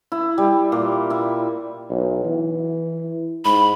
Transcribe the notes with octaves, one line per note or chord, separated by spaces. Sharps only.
E4
G3
A#2
E4
B1
E3
G#2 B5